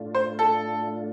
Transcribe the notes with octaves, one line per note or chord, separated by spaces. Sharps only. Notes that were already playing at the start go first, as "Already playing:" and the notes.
Already playing: A2 A3 D4 F4
C5
A4